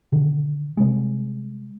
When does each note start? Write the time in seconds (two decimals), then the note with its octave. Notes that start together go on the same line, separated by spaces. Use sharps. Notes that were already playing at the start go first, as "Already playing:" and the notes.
0.12 B2 D3 D#3
0.77 C3 G3 G#3